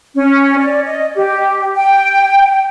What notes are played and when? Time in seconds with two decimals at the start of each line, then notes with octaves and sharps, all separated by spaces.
0.15 C#4
0.58 D5
0.85 D#5
1.14 G4
1.76 G5